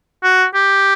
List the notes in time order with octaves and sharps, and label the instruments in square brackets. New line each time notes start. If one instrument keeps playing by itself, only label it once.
[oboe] F#4
G4